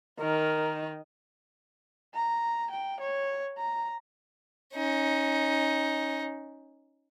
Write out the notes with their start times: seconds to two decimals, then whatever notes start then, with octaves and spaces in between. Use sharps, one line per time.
0.19 D#3 A#4
2.15 A#5
2.71 G5
3.01 C#5
3.58 A#5
4.74 C#4 D#4